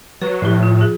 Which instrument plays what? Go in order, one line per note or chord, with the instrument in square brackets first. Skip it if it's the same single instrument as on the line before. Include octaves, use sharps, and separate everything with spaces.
[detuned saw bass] F#3 [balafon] B4
[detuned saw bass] A2 [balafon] F3 G4
[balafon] F4
F4 G#4